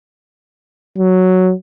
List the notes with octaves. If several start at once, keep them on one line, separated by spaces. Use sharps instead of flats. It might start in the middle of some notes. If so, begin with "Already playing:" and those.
F#3